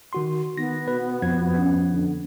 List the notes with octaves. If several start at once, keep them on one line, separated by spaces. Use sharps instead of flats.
D#3 F#4 C6
D#3 B3 A#6
B2 B4
F2 F3 G#6
C#4
D3